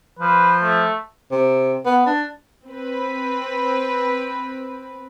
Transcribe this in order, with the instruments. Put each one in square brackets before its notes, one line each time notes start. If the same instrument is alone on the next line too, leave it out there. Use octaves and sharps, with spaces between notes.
[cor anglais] F3 [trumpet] B4
[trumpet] A3
[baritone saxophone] C3
B3
D4
[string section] C4 B4